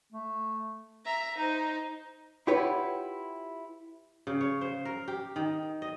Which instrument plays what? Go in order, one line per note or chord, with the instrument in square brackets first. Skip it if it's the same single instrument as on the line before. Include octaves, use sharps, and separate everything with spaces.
[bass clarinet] A3
[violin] E5 A#5
D#4 C5
[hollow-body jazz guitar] E4 F4 G4 B4 C#5 F#5
[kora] C#3
C#5
C5
A#4
G4
D#3
D#5